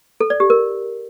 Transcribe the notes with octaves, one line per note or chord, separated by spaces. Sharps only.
A4
D5
G4
A#4